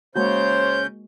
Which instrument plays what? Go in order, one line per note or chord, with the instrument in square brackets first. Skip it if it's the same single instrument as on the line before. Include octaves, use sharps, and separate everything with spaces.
[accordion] C#3 G6 [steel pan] G#3 A#3 F#4 [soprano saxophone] C5 [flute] C#5